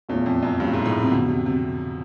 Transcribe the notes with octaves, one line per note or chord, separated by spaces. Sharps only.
E2 A#2 F3 A3 C#4 F4
F2
F#2
G2 A#2 F3 A3 C#4 F4
G#2
A2
C3
F2 B2 D3 F#3
C3
C3